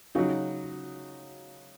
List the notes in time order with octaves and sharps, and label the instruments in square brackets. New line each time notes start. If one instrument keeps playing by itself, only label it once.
[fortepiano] C#3 F#3 D#4